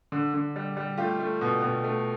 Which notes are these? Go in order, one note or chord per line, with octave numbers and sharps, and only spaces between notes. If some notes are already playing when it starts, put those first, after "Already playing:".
D3
D3
G3
G3
A3 F4 G4
A3
B2
B2
A3